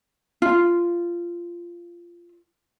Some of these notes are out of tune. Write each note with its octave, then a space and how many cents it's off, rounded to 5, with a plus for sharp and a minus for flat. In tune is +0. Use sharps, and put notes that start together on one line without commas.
F4 -15